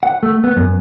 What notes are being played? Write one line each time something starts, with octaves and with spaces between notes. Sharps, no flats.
F#5
A3
B3
F#2